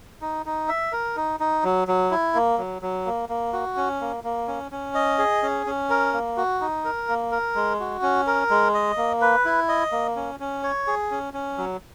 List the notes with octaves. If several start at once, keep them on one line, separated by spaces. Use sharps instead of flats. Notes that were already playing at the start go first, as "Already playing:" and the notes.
D#4
D#4
E5
A#4
D#4
D#4
F#3
F#3
E4
A#3
F#3
F#3
A#3
A#3
F#4
C#4
A#3
A#3
C#4
C#4
D#5
G#4
C#4
C#4
A#4
A#3
F#4
D#4
A#4
A#3
A#4
G#3
F#4
C#4
A#4
G#3
D#5
A#3
B4
E4
D#5
A#3
C#4
C#4
C#5
G#4
C#4
C#4
F#3